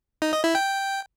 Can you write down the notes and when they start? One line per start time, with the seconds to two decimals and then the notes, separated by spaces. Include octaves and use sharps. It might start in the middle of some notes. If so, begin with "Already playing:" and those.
0.22 D#4
0.33 D#5
0.44 E4
0.55 G5